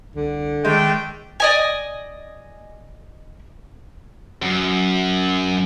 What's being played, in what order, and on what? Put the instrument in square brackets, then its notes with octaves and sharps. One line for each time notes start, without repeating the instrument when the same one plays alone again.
[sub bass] C2 [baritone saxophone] D3
[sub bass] D#3 [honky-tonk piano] G#3 [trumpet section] A3 D4 G5
[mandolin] D5 D#5 G#5
[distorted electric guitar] F#2